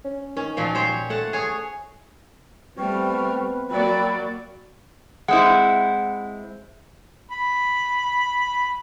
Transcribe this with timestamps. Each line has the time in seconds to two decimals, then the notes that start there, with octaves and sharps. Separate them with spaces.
0.04 C#4
0.37 D#3 C#4
0.57 A#2 F3 F#3
0.75 G4 C5 C#5
1.10 A3 C#5 F#5 A5
1.33 G#4 C#5
2.77 G3 A3 B3 C4 B4 G5 C#6 F6
3.70 F#3 A#3 F#4 D5 G5 B5 E6
5.28 G#3 C4 E4 F#5
7.31 B5